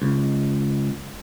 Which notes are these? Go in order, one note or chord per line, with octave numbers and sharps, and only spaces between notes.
C#2